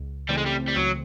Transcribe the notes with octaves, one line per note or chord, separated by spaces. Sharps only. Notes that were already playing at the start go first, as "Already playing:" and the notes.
Already playing: C#2
C#3 E3 G3 A3 C4
G#3
G3
G3
C#2 F#3